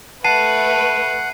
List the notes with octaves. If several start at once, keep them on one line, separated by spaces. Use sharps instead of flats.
A3 B4 F#5 A5 C7 D#7